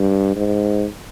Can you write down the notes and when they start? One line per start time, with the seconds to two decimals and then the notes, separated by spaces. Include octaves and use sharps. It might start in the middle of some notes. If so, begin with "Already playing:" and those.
Already playing: G2
0.36 G#2